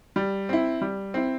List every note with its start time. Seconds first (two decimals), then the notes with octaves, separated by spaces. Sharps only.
0.16 G3
0.49 C4 E4
0.81 G3
1.14 C4 E4